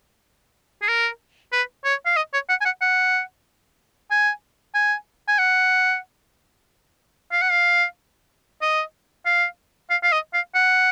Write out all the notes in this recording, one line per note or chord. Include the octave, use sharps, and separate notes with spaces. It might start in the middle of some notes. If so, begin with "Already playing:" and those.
G#4
A#4
B4
C#5
F5
D#5
C#5
F#5
G#5
F#5
F#5
G#5
G#5
G#5
F#5
F5
F#5
F5
D#5
F5
F5
F5
D#5
F5
F#5